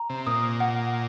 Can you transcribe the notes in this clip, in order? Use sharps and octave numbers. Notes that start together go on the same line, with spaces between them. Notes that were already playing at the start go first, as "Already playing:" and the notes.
Already playing: A#5
C3
A#2 D#6
F#5